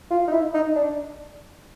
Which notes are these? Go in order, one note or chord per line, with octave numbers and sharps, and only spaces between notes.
F4
D#4
E4
D#4
D4